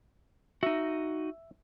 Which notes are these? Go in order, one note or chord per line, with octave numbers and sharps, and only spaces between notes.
D#4 F#4 E5